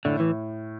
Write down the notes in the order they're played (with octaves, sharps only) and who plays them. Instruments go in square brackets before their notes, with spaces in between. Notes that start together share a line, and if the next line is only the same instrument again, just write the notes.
[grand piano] A2 [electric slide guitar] D3
[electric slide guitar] E3